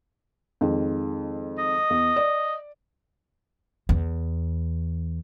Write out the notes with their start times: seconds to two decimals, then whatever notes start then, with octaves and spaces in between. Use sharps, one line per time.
0.61 F2 D#3 G#3
1.58 D#5
1.90 E2
2.16 D5
3.89 E2